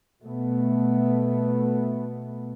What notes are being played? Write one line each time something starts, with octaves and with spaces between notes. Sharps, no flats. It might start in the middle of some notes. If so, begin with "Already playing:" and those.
B2 A3 B3